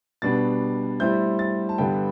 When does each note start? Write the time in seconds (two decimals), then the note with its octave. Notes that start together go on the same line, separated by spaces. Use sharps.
0.22 B2 G3 B3 D4 A6
1.00 A2 G3 C4 E4 G6
1.39 A6
1.69 A5
1.78 G2 D3 G3 B3 G5